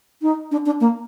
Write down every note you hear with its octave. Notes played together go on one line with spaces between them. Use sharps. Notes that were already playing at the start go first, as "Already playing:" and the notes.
D#4
D4
D4
A#3